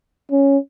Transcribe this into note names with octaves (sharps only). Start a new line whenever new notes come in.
C#4